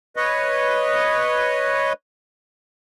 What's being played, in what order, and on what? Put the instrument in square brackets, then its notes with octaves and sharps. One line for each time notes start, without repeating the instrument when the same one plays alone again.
[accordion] B4 C#5 D#5